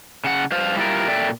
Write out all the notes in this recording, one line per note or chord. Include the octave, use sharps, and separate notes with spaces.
C#3 F#5
G2 C5 F5
G3 E4 F4 A#4
A#2 A4 D5 E5 G5